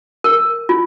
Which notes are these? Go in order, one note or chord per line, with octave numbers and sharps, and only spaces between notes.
A#4
F4